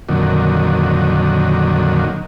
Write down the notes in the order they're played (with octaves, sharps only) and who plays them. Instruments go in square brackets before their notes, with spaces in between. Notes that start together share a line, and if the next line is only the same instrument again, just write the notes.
[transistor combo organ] F2 A#2 D3 D#3 F#3